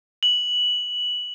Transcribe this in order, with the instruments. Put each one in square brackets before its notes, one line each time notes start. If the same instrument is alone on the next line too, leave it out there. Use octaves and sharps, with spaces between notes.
[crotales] F#7